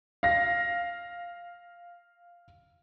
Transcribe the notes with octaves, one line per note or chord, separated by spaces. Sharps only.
F5 A#6